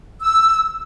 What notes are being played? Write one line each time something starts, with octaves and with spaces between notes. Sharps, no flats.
E6